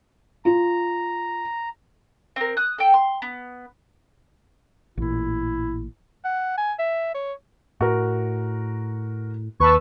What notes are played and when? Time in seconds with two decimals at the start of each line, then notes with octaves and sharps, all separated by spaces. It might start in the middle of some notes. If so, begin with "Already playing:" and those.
0.45 F4 A#5
2.36 C4 A#4
2.57 D#6 F#6
2.78 A4 G5
2.94 C6
3.22 B3
4.97 A1 A#2 E4
6.25 F#5
6.58 G#5
6.79 E5
7.15 C#5
7.81 A2 F#4 A#4
9.60 D#2 B4 A5 C#6 E6